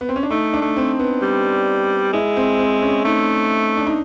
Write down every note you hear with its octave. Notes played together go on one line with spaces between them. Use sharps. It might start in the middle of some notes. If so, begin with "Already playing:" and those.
B3
C4
C#4
D4
A3 D#4
D4
A3
C4
B3
G3
G#3 E4
C4
C4
C#4
A3 D#4
D4
D#4